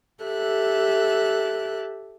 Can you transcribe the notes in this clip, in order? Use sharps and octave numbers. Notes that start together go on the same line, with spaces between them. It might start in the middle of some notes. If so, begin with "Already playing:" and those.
G4 A4 E5 F#6